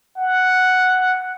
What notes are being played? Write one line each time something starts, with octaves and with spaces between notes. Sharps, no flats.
F#5